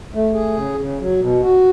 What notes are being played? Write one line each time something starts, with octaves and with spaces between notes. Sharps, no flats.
A3
G#4
C#3
C#3
F#3
B2
F#4